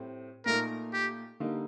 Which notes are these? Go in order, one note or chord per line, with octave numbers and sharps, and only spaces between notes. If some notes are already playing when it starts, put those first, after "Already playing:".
Already playing: A2 G3 C4
A#2 A3 D#4 A#4
G4
D3 G3 A#3 D#4